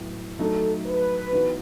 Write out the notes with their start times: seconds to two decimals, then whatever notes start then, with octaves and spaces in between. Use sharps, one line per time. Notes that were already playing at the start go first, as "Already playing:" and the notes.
Already playing: A2 F#3 B3
0.39 F#3 A3 D#4 A4
0.85 B4
1.33 E3 B3 D#4 F#4